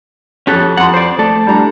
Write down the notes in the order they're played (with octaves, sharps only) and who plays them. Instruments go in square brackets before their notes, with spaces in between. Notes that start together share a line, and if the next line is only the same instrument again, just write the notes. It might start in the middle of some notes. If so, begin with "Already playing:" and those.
[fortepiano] F2 F#6 [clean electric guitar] C#4 G4 A4
[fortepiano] F2 C6 [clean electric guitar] F#5
[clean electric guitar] C5 D5
[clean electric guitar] A3 A4 [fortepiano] D5
[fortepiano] G3 D4 A#5